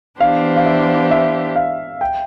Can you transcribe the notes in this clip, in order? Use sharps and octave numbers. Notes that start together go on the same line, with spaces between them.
E3 B3 D4 G4 C5 F5
F5
E5
E5
F5
G5